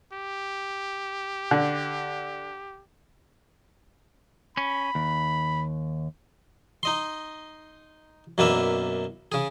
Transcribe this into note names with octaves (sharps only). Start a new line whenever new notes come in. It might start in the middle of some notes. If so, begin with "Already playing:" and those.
G4
D3
C#4 B5
D#2
D#4 D#5 C6
F#2 B2 A#3 D4 B4 E5
C#3 G#4